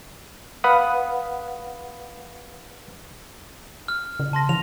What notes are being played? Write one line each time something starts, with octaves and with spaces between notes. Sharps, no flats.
B4 F5 F#5 B5 D#6
F6
C#3
A5 C6 A#6
E3 F7